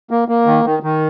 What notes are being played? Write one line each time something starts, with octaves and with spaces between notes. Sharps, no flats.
A#3
A#3
D#3
D#3
D#3